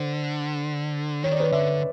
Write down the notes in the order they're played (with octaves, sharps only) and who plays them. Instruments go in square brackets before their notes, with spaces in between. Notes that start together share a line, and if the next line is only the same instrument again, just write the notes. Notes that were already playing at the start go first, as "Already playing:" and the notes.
Already playing: [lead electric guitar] D3 [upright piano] C5
[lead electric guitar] D#3 [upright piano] C#5
[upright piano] D5
B4 C#5
[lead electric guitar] D3 [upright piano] D5 E5